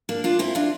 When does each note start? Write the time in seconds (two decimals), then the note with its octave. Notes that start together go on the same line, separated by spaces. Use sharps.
0.09 A#3 D4
0.24 D4 F4
0.39 C4 E4
0.55 D4 F4